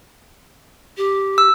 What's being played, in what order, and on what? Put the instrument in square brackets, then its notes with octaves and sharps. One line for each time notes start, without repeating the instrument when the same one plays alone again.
[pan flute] G4
[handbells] E6